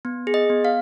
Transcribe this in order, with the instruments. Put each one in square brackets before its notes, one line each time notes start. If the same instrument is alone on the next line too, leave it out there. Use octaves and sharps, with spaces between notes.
[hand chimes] B3
G#4
D#5
B3
F5